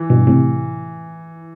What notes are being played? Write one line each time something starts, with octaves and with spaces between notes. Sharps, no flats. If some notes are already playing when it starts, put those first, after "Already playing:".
Already playing: E3
G2 B2
A2 C3